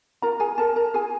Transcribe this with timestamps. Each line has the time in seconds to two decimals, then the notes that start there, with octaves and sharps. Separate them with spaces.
0.22 F4 A#4 A#5
0.40 G#4 G#5
0.58 A4 A#4 A5
0.76 A#4 A#5
0.94 F4 G#4 G#5